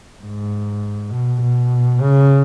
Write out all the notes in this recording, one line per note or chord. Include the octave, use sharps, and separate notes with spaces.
G#2
B2
B2
C#3